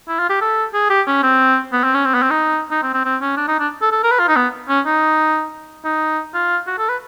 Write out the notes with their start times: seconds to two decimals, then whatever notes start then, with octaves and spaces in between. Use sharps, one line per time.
0.08 E4
0.19 F4
0.29 G4
0.41 A4
0.74 G#4
0.90 G4
1.07 C#4
1.23 C4
1.73 B3
1.84 C4
1.94 C#4
2.05 C4
2.14 B3
2.23 C4
2.31 D#4
2.71 D#4
2.83 C4
2.94 C4
3.05 C4
3.22 C#4
3.37 D4
3.48 D#4
3.60 D4
3.82 A4
3.92 A4
4.03 A#4
4.11 B4
4.19 F4
4.29 D#4
4.36 B3
4.69 C#4
4.86 D#4
5.85 D#4
6.34 F4
6.67 F#4
6.78 A4
6.89 B4